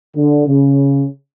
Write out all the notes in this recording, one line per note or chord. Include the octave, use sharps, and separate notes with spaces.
D3
C#3